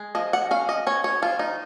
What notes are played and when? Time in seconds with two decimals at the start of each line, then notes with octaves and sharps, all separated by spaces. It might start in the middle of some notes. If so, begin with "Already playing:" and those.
Already playing: G#3
0.15 F3 D#5
0.33 F#5
0.51 C#4 F5
0.69 D#5
0.87 C#4 C#5
1.04 C#5
1.22 F3 F4
1.39 D#4